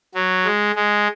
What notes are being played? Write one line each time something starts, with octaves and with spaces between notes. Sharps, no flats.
F#3
G#3
G#3